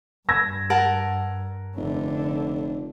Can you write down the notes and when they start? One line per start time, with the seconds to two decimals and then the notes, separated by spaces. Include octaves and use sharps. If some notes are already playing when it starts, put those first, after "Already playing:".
0.29 G2 E6 G#6 A#6
0.70 A#4 F#5 A5
1.77 F1 D3